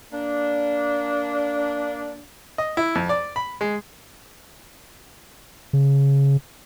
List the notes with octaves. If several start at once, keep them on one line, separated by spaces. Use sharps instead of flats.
A#3 D4
D#5
E4
F2
D5
B5
G#3
C#3